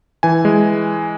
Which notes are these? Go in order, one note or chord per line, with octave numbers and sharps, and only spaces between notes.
E3 G#5
G#3